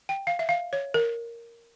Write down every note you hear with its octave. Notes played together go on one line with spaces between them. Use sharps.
G5
F5
E5
F5
C#5
A#4